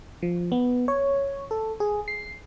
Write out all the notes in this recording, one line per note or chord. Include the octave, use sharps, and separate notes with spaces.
F3
B3
C#5
A4
G#4
C7